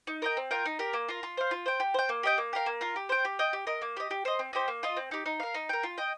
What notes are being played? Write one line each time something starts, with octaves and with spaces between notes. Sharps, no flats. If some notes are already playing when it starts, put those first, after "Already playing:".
D#4
A#4 D#5 G5
C4
F4 A#4 G5
D#4
G4 A#4
A#3
F4 A#4
F4
C5 F5
F4
C5 G5
G4
C5 G5
A#3
G4 D#5 G5
A#3
G4 A#4 F5
A#3
F4 A#4
G4
C5 G5
G4
D#5 G5
G4
A#4 D#5
A#3
G4 D#5
G4
C5 D#5
C4
D#4 G4 C5
A#3
F4 D#5
C4
D#4 G4
D#4
A#4 F5
D#4
A#4 G5
F4
D#5 G5